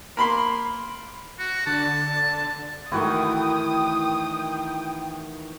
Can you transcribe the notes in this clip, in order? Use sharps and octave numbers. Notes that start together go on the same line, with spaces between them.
A#3 B5 C6
F#4
D3 A5
D#3 E3 A3 E4 F#4 A#4 G5 D#6